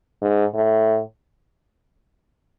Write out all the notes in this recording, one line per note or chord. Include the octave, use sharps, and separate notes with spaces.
G#2
A2